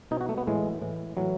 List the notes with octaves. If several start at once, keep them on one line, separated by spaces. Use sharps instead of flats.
B2 D#4
F#4
A3
B3
A2 E3 G#3
A2 E3
A2 E3 F#3